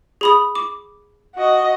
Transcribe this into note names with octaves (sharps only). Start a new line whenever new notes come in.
G#4 B5 D#6
D6
F#4 D#5